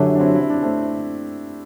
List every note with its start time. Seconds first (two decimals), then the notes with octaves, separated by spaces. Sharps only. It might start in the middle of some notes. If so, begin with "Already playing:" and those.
Already playing: F#2 D3 F#3 E4 G4
0.15 D4
0.20 C4 E4
0.35 E4
0.50 D4
0.63 A3 C4